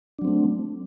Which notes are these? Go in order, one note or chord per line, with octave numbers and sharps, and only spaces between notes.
F#3 A3 C4 D4